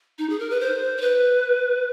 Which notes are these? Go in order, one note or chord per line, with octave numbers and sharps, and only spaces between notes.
D#4
G#4
A#4
B4
C5
C5
B4